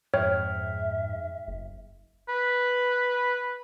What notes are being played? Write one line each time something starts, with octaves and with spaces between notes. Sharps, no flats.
F2 G#2 C#5 E5 G5 F6
F#1
B4